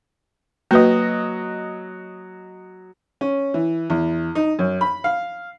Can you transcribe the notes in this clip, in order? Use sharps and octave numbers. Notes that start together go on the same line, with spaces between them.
F#3 A#3 B4 D#5
C#4
E3
E2
D#4
F#2
B5
F5